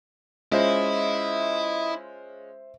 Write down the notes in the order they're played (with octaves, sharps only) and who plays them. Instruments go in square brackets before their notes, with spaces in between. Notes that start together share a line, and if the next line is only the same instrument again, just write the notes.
[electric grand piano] G#3 C#4 F4 [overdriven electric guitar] E4 [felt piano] C5 E5 [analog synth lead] D#5